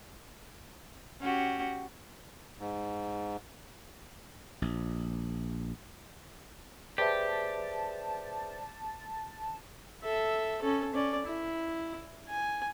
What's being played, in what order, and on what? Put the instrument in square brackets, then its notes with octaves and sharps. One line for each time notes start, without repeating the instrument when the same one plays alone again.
[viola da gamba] C#4 F#4 G4
[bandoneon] G#2
[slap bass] A#1
[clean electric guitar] G4 [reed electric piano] G#4 B4 E5 [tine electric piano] C5 D5 [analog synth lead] A5
[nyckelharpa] A4 E5
C#4 A4
C#4 D5
E4
G#5